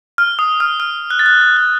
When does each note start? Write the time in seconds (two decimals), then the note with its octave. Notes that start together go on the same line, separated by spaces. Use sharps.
0.18 F6
0.39 D#6
0.60 F6
0.80 F6
1.10 F#6
1.19 A6
1.26 F#6
1.41 A6
1.57 F#6